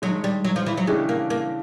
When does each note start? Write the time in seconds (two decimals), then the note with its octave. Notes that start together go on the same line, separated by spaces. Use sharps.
0.02 G2 D#3 F#3 G#3
0.24 G3
0.45 F#3
0.56 F3
0.66 E3
0.77 F#3
0.87 C#3 E3 G#3 A3 D4 G4
1.09 A#3
1.30 A#3